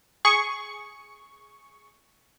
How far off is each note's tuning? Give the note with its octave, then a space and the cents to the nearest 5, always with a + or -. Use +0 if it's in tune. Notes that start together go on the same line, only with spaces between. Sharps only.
G#4 +0 C#6 +0